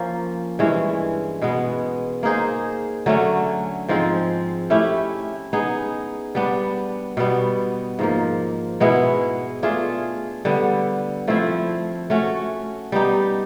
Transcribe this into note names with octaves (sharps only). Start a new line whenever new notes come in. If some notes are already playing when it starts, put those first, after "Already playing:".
Already playing: F3 A#3 C#4
G2 E3 G#3 C#4
B2 G#3 B3
A#3 D#4 G#4 C5
D3 F#3 A3 C#4
G#2 F3 G#3 C4
A3 C#4 E4 G4
B3 D#4 G#4
G3 B3 D4
B2 G3 B3
G#2 F3 A#3
B2 G#3 B3 E4
A3 D4 F4 G#4
D3 G3 B3
F3 A3 C4 E4
A3 C#4 F#4
G3 B3 D#4 G4